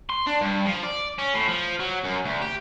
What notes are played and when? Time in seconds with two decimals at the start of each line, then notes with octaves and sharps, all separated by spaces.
0.10 C6
0.27 D4
0.41 G2
0.66 F3
0.83 D5
1.19 C#4
1.34 A2
1.49 F3
1.79 F#3
2.04 F#2
2.25 D2
2.41 G4